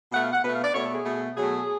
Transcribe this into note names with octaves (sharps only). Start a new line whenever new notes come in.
B2 A3 F#5
F5
F#5
B2 A3 B4
F5
D5
B2 A3 C#5
A4
G#4
B2 A3
B2 F#3 A3 G#4